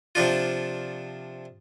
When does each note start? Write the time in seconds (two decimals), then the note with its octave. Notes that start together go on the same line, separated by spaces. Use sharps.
0.15 C3 F3 D4 F4